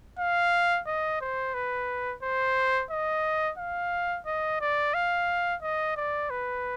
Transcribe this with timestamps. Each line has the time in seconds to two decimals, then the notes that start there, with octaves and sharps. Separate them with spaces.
0.19 F5
0.86 D#5
1.21 C5
1.54 B4
2.23 C5
2.91 D#5
3.58 F5
4.26 D#5
4.61 D5
4.94 F5
5.62 D#5
5.97 D5
6.30 B4